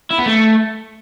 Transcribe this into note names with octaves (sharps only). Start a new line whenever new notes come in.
E4
B3
A3